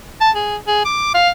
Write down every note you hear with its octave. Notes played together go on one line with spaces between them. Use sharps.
A5
G#4
G#4
D6
F5